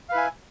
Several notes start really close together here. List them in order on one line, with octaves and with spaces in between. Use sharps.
F5 B4 E4 G#5